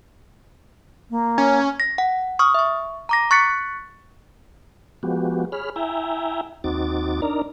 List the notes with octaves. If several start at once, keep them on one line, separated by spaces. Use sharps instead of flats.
A#3
C#4
A#6
F#5
C#6 D#6 F6
E5 C#6
A#5 D6 A#6
C#6 F#6 A6 B6 C#7
F3 G#3 B3 F#4 G4
G#4 C#5 B5 F6
E4 E5 G5 G#5 A#5
D#2 C4 D#4 F#4 D6 A6
D4 D#4 A#4 D5 A#5